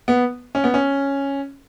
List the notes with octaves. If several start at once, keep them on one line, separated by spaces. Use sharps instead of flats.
B3
C#4
B3
C#4